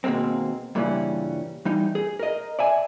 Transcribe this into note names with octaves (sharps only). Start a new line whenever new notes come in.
D#2 B2 G#3 A#3 C4
G2 A#2 C#3 E3 G3 C#4
E3 G3 D#4
G#4
A#4 D#5
D5 E5 G#5